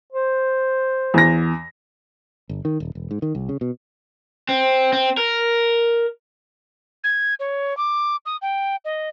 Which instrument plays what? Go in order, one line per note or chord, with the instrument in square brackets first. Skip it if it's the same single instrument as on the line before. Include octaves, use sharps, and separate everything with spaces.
[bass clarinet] C5
[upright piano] E2 A#6
[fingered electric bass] G1
D#3
D#1
E1
G#2
D#3
C2
C#3
B2
[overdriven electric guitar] C4
C4
A#4
[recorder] G#6
C#5
D6
D#6
G5
D#5